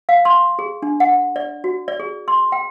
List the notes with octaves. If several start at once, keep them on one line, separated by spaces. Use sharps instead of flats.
F5
C6
G#4
D4
F#5
D5
F#4
D5
G#4
C6
G5